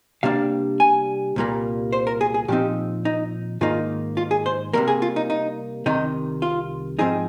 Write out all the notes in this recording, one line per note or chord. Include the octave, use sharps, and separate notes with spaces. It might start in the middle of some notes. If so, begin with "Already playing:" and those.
C3 G3 A#3 D4 F5
G#5
C2 A#2 G3 A#3
C5
A#4
G#4
G#4
A#2 F3 C4 D#4 G4
D#4
G#2 D#3 A#3 D#4 F4
F4
G#4
C5
C3 G3 A#3 A#4
G#4
F4
D#4
D#4
C2 C3 D#3 D#4
F4
G#2 F3 C4 D#4 G#4